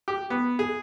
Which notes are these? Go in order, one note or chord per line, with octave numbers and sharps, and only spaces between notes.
G4
B3
G#4